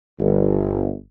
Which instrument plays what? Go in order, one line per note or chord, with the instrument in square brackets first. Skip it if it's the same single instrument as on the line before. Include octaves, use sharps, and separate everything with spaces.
[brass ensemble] G1